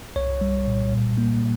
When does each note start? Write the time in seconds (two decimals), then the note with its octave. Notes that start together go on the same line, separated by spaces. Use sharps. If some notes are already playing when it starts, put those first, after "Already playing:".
0.16 C2 C#5
0.41 G3
0.67 A#2
0.93 A#2
1.18 A#3